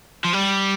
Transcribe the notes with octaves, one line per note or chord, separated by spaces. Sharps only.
F3
G3